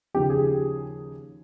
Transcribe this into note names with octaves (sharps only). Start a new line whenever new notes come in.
D#2 C#3 F3 G4
G#4